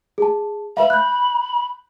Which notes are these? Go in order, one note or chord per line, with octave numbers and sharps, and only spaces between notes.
G#4 A5
B4 E5 F5 B5
F#6 G6